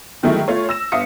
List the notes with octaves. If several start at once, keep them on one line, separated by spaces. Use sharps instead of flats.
G2 D#3 F#3 G#3 A3 E4
A3 F4 C#5
E6 A#6 E7
G1 E5 F5 D#6 C#7